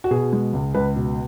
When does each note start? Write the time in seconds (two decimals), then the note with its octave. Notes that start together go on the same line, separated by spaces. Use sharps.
0.04 F#4
0.11 B2 G#4
0.33 G#3
0.53 C#2
0.74 C#2 B4
0.96 B2